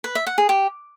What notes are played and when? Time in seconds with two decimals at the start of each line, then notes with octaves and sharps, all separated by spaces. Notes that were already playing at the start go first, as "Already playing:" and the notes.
0.04 B4
0.15 E5
0.27 F#5
0.38 G#4
0.49 G4